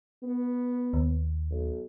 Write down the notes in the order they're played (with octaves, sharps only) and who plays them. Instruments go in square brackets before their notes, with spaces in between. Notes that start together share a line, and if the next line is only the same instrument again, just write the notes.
[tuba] B3
[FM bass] D#2
[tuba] B1